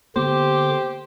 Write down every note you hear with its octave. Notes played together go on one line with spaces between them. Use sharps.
D3 A#3 B3 G4 C5 D6